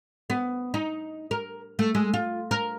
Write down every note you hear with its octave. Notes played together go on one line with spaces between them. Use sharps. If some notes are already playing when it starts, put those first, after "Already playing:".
B3
D#4
A#4
A3
G#3
F4
A#4